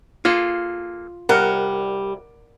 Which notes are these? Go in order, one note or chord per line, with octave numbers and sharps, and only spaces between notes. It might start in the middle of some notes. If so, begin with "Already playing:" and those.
A#3 F4 G#4 A4
C2 G3 A#4 F#5